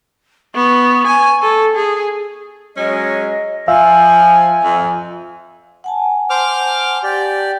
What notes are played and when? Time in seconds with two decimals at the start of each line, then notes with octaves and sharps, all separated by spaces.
0.55 B3 C#6
1.07 G#5
1.42 A4
1.76 G#4
2.76 F#3 G#3 C#4 D#5
3.68 F3 E5 F5 G#5 E6
4.64 F2
5.84 F#5 G#5 A5
6.30 C5 D6 F6
7.04 G4 D5